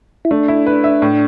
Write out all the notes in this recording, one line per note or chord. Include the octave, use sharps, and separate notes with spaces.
E4
A3 D4
E4
B4
E5
A2